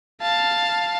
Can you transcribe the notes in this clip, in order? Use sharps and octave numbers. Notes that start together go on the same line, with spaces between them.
F5 A5